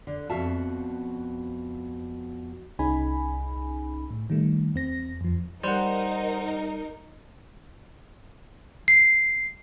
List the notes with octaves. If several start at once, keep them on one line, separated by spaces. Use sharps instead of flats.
D3
F2 B2 F#4 E5 F5 A5
C2 C#4 D#4 G#4 G#5 B5
A2
D#3 G3 A3
E2 C4 A#6
F2 F3
G3 D#4 A#4 C5 F#5
C7